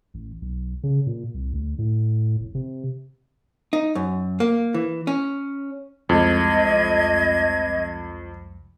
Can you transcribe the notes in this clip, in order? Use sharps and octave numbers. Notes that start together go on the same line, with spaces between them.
A1
B1
C#3
A#2
C2
D2
A2
F1
C3
D#4
F#2
A#3
E3
C#4
F1 C2 F2 G#3 D#5 G#6